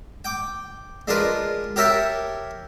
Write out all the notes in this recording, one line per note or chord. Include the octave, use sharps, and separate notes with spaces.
G5 D6
G#3 D4 F4 A#4 B4
G4 A#4 C#5 E5 G5 A5